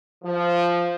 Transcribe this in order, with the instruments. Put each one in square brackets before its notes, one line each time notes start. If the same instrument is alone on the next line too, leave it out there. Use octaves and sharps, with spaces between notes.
[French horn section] F3